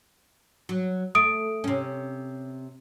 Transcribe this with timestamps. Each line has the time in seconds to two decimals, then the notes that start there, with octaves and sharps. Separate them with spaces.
0.69 F#3
1.15 A3 D#6 D7
1.64 C3 C#4